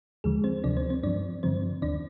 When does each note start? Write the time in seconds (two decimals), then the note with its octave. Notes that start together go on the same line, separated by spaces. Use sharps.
0.24 D#2 D3 F3 G#3 G#4
0.44 C4 C5
0.64 D2 C3 F3 D4 D5
0.77 C4 C5
0.90 C4 C5
1.03 G2 F3 D4 D5
1.43 G2 D3 F3 C4 C5
1.82 D#2 D#3 D4 D5